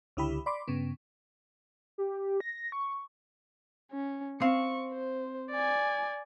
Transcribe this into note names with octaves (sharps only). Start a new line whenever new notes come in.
C#2 D3 E4 G4 B5
D5 B5 C6 D6
G2 C#3 B3
G4
A#6
C#6
C#4
C4 F5 C#6
C5
D5 G#5